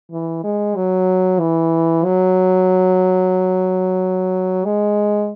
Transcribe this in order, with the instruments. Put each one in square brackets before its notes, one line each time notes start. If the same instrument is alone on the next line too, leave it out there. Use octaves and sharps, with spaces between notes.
[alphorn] E3
G#3
F#3
E3
F#3
G#3